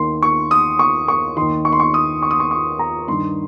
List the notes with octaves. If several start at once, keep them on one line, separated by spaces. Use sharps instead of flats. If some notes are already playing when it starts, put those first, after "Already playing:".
Already playing: D#2 D#3 C6
C#6
D#6
C#6
C#6
D#2 D#3 C6
C#6
C6
C#6
D#6
C#6
D#6
C#6
C#6
A#5
G2 D#3 C6